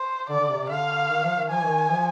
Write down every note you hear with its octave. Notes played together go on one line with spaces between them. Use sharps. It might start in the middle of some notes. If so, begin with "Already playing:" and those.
Already playing: C5
D3 D5
D3
C3
C3
D3 F5
D#3
F3
D#3
F3 G#5
D#3
F3